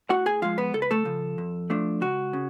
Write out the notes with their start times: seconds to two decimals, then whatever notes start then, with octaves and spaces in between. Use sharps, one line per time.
0.09 A2 F#4 F#5
0.26 G#4 G#5
0.42 F3 G#3 F4 F5
0.58 B3 B4
0.74 C#2 A4
0.82 B4
0.91 A3 A4
1.05 C#3 F3
1.38 F2
1.70 F3 A3 D4
2.01 C#2 F#4
2.33 C#3